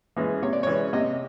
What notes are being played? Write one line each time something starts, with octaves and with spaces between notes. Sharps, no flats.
E3 G#3 C#4
C3 C#5
D5
E3 G#3 C#4 C#5
C3 D#5